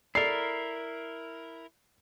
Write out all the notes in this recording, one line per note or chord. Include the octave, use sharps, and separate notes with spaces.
E4 A4 A#4 D5 C7